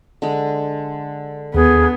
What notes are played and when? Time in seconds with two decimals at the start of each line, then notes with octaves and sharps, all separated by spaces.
0.22 D3 G#3
1.55 D#2 B3 G#4